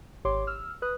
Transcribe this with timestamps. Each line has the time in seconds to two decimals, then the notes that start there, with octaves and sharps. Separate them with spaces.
0.25 G#1 G4 C#5 C6 D6
0.47 E6 F6
0.82 B4 D#6 F#6